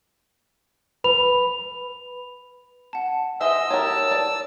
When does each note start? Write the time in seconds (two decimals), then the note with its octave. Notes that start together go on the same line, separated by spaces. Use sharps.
1.04 B4 B5 F7
2.93 F#5 A5
3.41 G#4 C5 D#5 E5 E6
3.70 G4 A#4 C#5 A5
4.11 D5